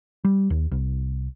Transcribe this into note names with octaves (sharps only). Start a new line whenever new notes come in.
G3
D#2
C2